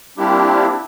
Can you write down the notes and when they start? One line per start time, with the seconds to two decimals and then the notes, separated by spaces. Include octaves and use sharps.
0.18 G3 A#3 C4 D4 E4 G4